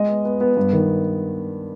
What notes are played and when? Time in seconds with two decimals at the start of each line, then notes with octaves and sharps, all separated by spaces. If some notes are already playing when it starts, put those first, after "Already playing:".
Already playing: G#3 D#5
0.08 B3
0.25 B3
0.41 B3
0.57 G2
0.73 D#3